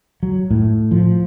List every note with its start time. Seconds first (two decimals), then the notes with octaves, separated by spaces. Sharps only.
0.23 F#3
0.51 A2
0.91 F3